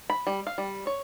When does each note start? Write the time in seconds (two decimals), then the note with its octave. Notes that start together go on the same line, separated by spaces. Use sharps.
0.10 B5
0.27 G3
0.47 F5
0.58 G3
0.87 C#5